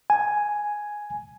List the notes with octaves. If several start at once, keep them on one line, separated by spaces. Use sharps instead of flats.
G#5